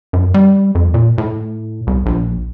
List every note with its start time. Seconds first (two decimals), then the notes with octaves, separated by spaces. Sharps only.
0.13 F#2
0.34 G3
0.75 F2
0.94 A#2
1.18 A2
1.87 C2
2.06 A#1